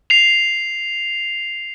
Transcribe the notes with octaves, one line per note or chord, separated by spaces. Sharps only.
C7 F7